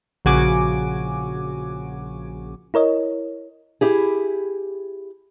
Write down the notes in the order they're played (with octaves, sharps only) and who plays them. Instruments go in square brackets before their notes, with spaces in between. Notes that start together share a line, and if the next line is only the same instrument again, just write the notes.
[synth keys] A#1 C#3 F#4 G#5 D6
[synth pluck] E4 A#4 C#5 D#5
[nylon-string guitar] E4 G4 G#4